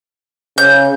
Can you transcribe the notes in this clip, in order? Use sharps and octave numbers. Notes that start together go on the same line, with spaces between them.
C#3 G6